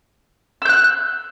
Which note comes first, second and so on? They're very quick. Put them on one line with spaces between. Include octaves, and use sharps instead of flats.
E6 G6 F#6